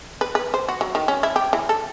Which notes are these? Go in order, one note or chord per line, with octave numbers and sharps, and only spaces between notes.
B4
B4
C5
F#4
F#3
D#3
C#4
E4
G4
E3
A4